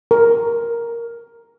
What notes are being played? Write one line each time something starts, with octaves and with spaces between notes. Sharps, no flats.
A#4